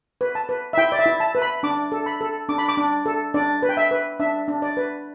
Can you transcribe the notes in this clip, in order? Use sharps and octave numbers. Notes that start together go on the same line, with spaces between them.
B4
A5
B4
E5
E4 G5
D5
E5
E4
A5
B4
B5
D4 D6
A4
B5
A4
D4 D6
B5
D6
D4
A4
D4 D5
B4
G5
E5
B4
D4 E5
D4
D5
B4